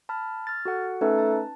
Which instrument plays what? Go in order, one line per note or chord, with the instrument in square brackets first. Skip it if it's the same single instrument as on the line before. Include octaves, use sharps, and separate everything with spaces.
[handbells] A5 B5 F6
F6 A6
F#4 A4 F#5
[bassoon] A3 [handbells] C#4 D#4 B4
[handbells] A5